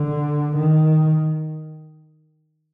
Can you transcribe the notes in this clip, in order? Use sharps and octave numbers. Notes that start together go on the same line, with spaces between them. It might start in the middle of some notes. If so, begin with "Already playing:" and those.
Already playing: D3
D#3